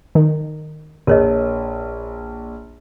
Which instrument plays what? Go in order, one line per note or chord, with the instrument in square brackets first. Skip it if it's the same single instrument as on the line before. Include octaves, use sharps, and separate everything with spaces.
[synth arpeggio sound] D#3
[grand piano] A#1 [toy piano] A#4 C#5 D#5